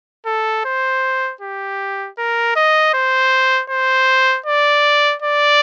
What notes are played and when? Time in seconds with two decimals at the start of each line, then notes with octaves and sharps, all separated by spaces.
0.26 A4
0.65 C5
1.41 G4
2.18 A#4
2.56 D#5
2.94 C5
3.70 C5
4.46 D5
5.22 D5